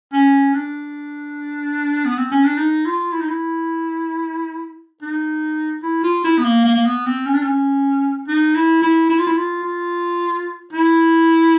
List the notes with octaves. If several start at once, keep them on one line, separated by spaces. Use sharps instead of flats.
C#4
D4
B3
C4
C#4
D4
D#4
F4
E4
D#4
E4
D#4
E4
F4
E4
B3
A#3
A#3
A#3
B3
C4
C#4
D4
C#4
D#4
E4
E4
E4
F4
E4
F4
F4
E4